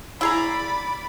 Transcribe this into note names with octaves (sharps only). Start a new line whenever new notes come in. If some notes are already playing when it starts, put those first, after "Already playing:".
E4 G#4 D5 A#5 B5